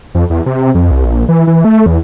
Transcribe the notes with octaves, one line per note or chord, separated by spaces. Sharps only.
F2
E2
C3
F2
C2
A#1
E3
E3
A3
E2